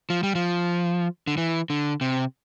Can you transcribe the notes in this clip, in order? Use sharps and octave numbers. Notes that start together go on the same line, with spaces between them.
F3
G3
F3
D3
E3
D3
C3